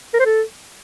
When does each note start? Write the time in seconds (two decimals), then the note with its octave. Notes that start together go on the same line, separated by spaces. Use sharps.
0.14 A#4
0.20 C5
0.26 A4